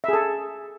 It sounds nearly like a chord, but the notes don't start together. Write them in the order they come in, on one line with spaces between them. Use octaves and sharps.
E5 G#4 A4